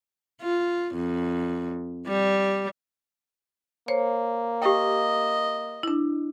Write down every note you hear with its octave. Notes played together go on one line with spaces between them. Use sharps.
F4
F2
G3
A#3 C5 C#5
G4 D#5 F5 G5
D4 E4